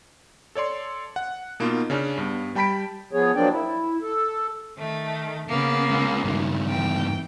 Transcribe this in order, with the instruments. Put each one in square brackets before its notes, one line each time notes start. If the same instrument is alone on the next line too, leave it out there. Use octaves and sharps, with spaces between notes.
[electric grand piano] A4 C#5 D5 C6
F#5
B2 A#3 B3 D#4 F4
C#3 C#4 D4
G2 B3
G3 G5 A5 B5 B6 D7
[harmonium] F3 B3 G#4 C#5
F3 F#3 A#3 D4 D5 G5
E4
A4
[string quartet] D#3 A3
C#3 A#3 B3
[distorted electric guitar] C#2
G2 D#3
[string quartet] E3 G5